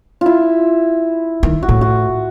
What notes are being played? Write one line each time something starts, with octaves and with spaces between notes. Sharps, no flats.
E4 F4
D#3
F#4
A2
F#4